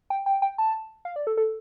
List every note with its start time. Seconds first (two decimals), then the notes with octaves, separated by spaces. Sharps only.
0.10 G5
0.26 G5
0.42 G5
0.58 A5
1.05 F5
1.16 D5
1.27 A4
1.37 A4